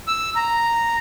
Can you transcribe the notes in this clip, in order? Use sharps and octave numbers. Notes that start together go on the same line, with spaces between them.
E6
A#5